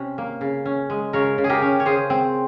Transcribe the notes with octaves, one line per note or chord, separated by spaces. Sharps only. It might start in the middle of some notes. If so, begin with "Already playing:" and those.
Already playing: C3 C#4
A#3
C#3
C#4
G#3
C#3 A#4 C#5
C#3
G#4
G4 A#4
C#4
C#5
C#3 G#4 C5
C4